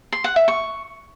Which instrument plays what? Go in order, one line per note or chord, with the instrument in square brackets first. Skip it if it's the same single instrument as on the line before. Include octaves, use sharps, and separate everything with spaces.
[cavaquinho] C6
F#5
E5
C#6